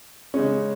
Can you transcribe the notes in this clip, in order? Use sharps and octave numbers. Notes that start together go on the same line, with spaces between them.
C#3 G#3 C#4